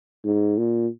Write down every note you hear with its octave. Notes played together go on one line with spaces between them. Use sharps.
G#2
A#2